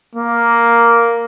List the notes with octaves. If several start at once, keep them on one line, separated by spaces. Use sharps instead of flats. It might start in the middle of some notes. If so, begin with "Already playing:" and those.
A#3